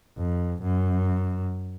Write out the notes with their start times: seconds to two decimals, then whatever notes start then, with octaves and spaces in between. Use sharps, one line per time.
0.18 F2
0.62 F#2